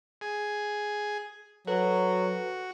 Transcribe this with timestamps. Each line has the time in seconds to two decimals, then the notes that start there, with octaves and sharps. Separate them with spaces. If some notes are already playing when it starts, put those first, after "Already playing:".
0.21 G#4
1.68 F#3 F#4 A4 B4